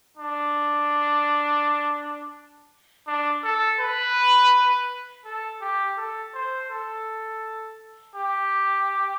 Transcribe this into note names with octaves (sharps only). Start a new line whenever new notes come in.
D4
D4
A4
B4
A4
G4
A4
C5
A4
G4